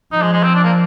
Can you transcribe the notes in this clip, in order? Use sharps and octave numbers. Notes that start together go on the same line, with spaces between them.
F3 D#4
G#3
G#3
C4
D4
A#3